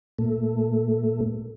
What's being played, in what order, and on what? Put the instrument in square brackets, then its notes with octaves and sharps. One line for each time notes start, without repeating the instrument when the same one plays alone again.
[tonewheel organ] A#2 A3